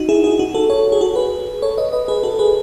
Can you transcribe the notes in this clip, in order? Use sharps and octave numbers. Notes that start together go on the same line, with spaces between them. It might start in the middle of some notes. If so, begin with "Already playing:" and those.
Already playing: D#4 F#4
E4 G#4
E4 G#4
D#4 F#4
F#4 A4
A4 C#5
G#4
F#4 A4
G#4 B4
A4 C#5
B4 D#5
B4 D#5
G#4 B4
F#4 A4
A4
G#4 B4